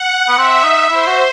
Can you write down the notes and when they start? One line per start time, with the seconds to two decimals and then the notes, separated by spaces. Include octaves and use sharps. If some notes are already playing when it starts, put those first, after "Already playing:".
Already playing: F#5
0.28 B3
0.37 C4 E5
0.63 D#4
0.90 E4 C5
1.07 F#4